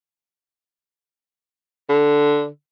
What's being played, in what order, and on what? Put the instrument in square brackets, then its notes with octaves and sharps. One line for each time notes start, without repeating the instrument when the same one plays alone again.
[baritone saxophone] D3